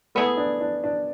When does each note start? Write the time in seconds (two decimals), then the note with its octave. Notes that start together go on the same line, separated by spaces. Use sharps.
0.15 A3 B3 E4 G#4
0.37 D4
0.61 D4
0.84 D4